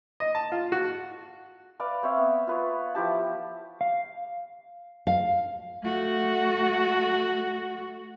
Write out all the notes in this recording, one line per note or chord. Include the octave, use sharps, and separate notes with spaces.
D#5
A5
F4
F#4
B4 D5 F5 B5
C4 C#5 E5
B3
F4 B4 C#5
F3 E4 G4 A5
F5
F5
A3 F#4